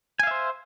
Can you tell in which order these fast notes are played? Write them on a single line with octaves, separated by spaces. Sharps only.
G#5 F5 E5 C5